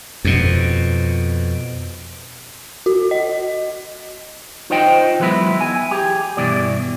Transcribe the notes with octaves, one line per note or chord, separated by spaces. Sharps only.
F2 B2
F#4
D#5
D#4 F4 C5 D#5 G5
E3 F#3 G#3 B3 E4
G#5
G4 G#4
G2 B2 E3 D5